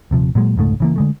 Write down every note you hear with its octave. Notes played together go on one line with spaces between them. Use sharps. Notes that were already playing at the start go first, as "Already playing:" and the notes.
D#1 C3 F3
A#2 F#3 G#3
F1 C#2 G#2 A3
C#3 E3 A#3
D3 G#3 A3